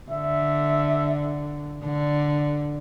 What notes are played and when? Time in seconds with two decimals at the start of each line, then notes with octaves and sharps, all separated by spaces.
0.10 D3 E5
1.83 D3